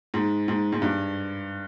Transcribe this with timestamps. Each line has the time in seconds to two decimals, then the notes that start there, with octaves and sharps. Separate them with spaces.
0.14 G#2
0.48 G#2
0.72 G#2
0.82 G2